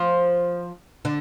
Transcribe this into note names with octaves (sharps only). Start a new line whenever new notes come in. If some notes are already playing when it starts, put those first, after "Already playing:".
Already playing: F3 F4
D3 D4